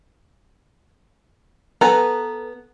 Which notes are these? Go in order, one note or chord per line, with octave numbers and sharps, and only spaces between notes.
B3 A4 B4 G#5 A#5